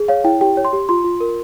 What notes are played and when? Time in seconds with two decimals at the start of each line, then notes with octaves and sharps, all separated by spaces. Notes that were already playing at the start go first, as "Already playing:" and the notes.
Already playing: G#4
0.08 C#5 F5
0.24 E4 G5
0.41 G4 G5
0.57 C#5
0.65 C6
0.73 G4
0.89 F4 C6
1.04 F4
1.20 A#4